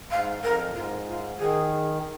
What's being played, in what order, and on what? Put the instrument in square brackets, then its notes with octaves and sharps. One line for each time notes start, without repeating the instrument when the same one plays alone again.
[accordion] G#2 [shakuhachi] F5
[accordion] F2 [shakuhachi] A#4
[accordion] A#2
[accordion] G#2 [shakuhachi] F4
[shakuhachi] F4
[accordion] D#3 [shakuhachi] G#4